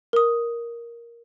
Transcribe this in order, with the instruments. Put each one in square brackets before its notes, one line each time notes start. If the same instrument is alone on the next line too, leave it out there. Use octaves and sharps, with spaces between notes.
[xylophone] A#4 D#6